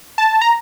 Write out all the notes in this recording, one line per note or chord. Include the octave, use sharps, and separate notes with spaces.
A5
A#5